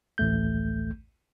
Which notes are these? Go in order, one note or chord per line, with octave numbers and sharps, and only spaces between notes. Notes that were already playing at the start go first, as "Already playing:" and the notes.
A1 D2 A3 G6